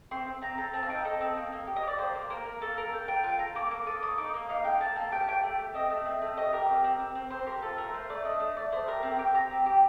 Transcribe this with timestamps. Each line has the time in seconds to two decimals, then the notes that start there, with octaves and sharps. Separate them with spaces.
0.11 C4 C6
0.26 C4
0.41 C4 A#5
0.58 A4 A#5
0.74 C4 A5
0.83 F5
0.89 D#4 G5
1.05 A4 D#5
1.21 C4
1.37 A#3
1.52 A#3
1.67 G4
1.76 D#5
1.83 G4 D5
1.98 A#3 C5
2.15 A#3
2.30 A#3 A#4
2.46 A#3
2.61 A#3 A4
2.77 A4 A#4
2.92 A4 G5
3.08 A#3 G5
3.24 F4 G5
3.39 A4 A#5
3.55 A#3 D6
3.71 A#3 D6
3.86 A4 D#6
4.02 A#3 D#6
4.18 D#4 D6
4.34 A#3
4.49 D#4 F5
4.64 A4 G5
4.80 A#3 A5
4.96 A#3 A5
5.12 G4 G5
5.20 A5
5.28 G4 G5
5.43 A3
5.59 G4
5.74 C4 D#5
5.90 A3
6.06 C4
6.22 A3
6.37 G4 D#5
6.53 G4 A#4
6.69 C4
6.84 C4
7.00 C4
7.15 C4
7.30 C4 C5
7.46 G4 A#4
7.62 F4 A4
7.77 A3 A#4
7.93 A3 C5
8.09 A3 D5
8.25 D4 D#5
8.40 A3
8.57 A3 D5
8.72 A3 C5
8.87 G4 A#4
9.03 C4
9.19 G4 G5
9.34 G4 A#5
9.50 C4
9.66 G4